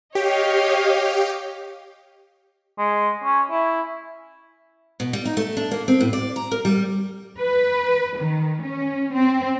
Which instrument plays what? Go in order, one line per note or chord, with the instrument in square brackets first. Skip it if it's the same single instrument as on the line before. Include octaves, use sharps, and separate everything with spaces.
[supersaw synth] G4 [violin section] C#5 D#5 F5
[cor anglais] G#3
C#4
E4
[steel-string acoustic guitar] B2
G3
D#4
A3
D4
A#3
C4
A2
D5
A#5
A#4
G3
[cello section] B4
D#3
C#4
C4